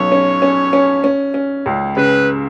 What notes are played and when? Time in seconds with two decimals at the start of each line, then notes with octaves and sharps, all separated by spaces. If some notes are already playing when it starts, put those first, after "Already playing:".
Already playing: B1 C#4 C#5
0.12 C#4
0.42 C#4
0.73 C#4
1.04 C#4
1.34 C#4
1.66 C#2
1.97 C#3 B4